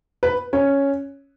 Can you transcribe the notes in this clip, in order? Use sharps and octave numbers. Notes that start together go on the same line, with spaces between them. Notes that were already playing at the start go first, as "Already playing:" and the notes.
B4
C#4 C#5